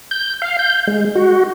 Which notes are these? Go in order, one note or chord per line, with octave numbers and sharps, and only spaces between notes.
G6
F5
G6
G#3
F#4